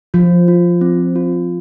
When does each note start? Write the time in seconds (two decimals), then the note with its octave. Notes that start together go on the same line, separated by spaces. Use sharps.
0.14 F3 F4
0.48 F4
0.81 C4
1.15 F4